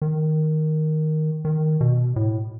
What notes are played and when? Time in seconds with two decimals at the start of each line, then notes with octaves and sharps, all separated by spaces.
0.02 D#3
1.45 D#3
1.81 B2
2.16 A2